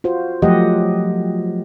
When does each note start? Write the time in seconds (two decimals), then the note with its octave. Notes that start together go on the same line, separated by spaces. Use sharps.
0.04 F4 F#4 C5
0.42 F3 F#3 A3 G4 D#5 F#5